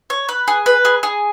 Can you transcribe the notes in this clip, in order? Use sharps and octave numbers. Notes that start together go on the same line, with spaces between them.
C#5
B4
G#4
B4
G#4
G#4